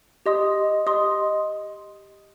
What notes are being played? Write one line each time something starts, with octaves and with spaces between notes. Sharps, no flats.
G4 D#5 C6 D#6
G4 D#5 C6 D#6